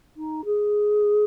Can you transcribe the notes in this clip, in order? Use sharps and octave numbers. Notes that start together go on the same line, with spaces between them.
D#4
G#4